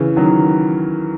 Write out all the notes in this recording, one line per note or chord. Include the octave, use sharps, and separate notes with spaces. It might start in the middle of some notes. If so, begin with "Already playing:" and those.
Already playing: C#3 E3
D#3 F#3